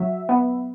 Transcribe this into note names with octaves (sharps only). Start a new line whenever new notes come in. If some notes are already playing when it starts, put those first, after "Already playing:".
Already playing: F#3 E5
B3